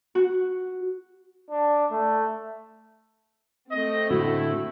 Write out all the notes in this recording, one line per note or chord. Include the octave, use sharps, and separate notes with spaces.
F#4
D4
A3
A3 C4 D#5
A2 D3 E4 F#4